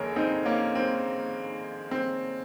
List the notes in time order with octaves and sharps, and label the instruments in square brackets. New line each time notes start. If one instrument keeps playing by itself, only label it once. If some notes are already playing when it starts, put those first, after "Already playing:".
Already playing: [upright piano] F1 D#2 C#3 A#4 C#5
C4 D#4
A#3 C#4
C4
C4